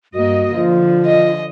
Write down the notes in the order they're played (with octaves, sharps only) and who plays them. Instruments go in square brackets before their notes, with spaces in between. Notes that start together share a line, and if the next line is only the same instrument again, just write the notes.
[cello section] G2 A#3 D#5 [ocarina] F#4
[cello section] D3 [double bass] F3 [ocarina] F4
[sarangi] D#5